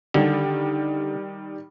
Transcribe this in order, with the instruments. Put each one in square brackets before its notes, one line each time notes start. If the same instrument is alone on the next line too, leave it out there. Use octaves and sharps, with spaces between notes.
[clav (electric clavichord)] D3 [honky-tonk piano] D#3 G3